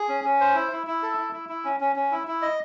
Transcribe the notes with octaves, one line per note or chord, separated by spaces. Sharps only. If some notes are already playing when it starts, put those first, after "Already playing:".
Already playing: G#4
C#4
C#4
C5
E4
E4
E4
A4
E4
E4
E4
C#4
C#4
C#4
E4
E4
D#5